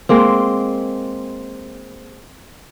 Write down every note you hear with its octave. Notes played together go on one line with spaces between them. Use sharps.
G#3 A#3 C4